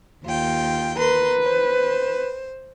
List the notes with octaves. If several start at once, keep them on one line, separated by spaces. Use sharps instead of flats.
D#2 F4 G5
A#4 B4 C6
C5